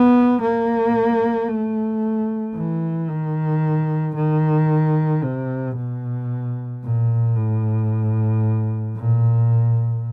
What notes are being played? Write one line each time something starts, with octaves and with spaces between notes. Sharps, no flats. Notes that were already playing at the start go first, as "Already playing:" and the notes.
Already playing: B3
A#3
A3
E3
D#3
D#3
C3
B2
A#2
A2
A#2